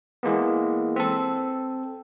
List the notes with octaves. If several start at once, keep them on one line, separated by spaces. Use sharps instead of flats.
E3 G#3 A#3 B3
C4 A4